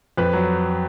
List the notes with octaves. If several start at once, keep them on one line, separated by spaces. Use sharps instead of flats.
F2 B4
F#3